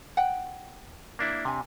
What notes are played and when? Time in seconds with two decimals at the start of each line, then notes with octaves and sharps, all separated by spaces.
0.17 F#5 G5
1.19 A#3 D4 E4
1.45 C3 D4 G#5